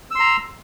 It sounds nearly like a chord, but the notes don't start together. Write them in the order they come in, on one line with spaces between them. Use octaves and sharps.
E6 C6 A#5